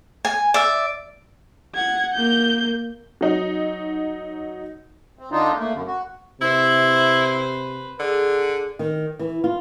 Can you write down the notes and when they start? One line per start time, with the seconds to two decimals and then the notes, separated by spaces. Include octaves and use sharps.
0.25 G#5
0.54 D5 E5
1.75 F#5 G#6
2.14 A#3 G6
3.21 F#3 D#4
5.19 C4
5.32 D3 D4 D#4 F4
5.57 A3 A#3
5.74 F#2 D3
5.87 F#4
6.41 C3 E4 B4 C5
7.99 D3 G#4
8.79 D#3
9.19 E3
9.44 F4